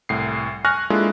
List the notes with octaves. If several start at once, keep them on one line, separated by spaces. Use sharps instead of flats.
C2 A2 C7
G#5 C#6 F6 F#6 A#6
G#3 A#3 D4 E4 F4 A4